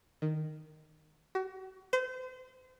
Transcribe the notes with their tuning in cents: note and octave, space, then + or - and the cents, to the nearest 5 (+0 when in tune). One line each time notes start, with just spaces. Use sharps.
D#3 -5
F#4 +35
C5 -35